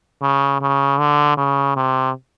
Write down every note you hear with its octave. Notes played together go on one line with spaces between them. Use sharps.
C#3
C#3
D3
C#3
C3